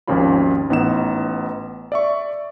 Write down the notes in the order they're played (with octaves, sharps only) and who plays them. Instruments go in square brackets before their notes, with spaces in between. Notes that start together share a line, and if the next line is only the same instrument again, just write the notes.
[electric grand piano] G#1 D#2 F3 C#4 F4 B5
A1 B3 D#4 B4 E7
D5 E5 C#6